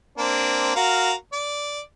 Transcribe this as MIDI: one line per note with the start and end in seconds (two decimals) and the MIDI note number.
0.18 0.73 58
0.18 0.73 60
0.18 0.73 62
0.76 1.13 66
0.76 1.13 70
0.76 1.13 77
1.33 1.80 74